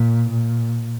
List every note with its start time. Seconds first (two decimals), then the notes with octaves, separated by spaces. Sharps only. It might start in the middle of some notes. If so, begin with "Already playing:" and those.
Already playing: A#2
0.30 A#2